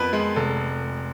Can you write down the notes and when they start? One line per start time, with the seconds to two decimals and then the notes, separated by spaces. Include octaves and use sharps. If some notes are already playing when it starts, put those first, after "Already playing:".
Already playing: F2 B3 B4
0.13 G#3
0.36 F1 A4